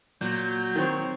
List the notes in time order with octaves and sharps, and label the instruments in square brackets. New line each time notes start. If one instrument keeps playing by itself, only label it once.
[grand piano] A#2 [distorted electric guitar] F#3 [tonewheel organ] G6
[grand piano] D#3 [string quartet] C4 C#5